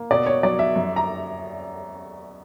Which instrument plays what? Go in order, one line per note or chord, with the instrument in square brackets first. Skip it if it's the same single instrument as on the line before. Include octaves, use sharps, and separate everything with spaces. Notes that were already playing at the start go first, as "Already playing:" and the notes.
Already playing: [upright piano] A#3
[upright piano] B2 [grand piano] D5
[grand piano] C#5
[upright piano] F#3 [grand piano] D5
[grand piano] E5
[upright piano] F#2
[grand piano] A#5